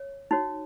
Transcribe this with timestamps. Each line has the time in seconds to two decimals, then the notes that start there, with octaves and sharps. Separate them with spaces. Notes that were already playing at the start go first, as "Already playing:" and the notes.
Already playing: C#5
0.31 D#4 F#4 C#5